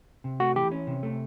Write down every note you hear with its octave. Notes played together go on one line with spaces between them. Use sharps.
C3
A3 F#4
E3 G4
C#4
C3
A3